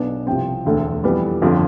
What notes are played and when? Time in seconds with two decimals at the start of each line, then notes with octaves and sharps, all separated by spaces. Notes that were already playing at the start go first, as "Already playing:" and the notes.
Already playing: B1 B2 B3 D4
0.26 C2 C3 F3 C4 G5
0.65 E1 D2 D3 A3
1.04 F2 E3 G3 B3
1.42 G1 F2 D3 F3